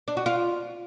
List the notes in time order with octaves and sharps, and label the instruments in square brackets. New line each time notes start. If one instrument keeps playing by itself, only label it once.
[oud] D4
F#4
F4